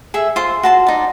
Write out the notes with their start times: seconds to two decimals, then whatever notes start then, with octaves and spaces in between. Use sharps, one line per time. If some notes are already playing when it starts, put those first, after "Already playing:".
0.14 G#4 A4 E5
0.36 F4 C5 C6
0.63 F#4 A5 C6
0.87 D#4 D5